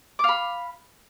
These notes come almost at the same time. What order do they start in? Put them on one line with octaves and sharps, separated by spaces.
D6 F5 B5